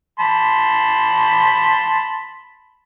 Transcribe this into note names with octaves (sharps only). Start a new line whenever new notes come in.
A5 B5 C6